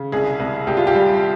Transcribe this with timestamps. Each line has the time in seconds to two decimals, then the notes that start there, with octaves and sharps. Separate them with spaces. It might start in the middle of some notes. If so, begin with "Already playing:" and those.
Already playing: C#3
0.12 C2 G#4
0.40 C2
0.67 C2 G4
0.77 F4
0.87 G4
0.95 G3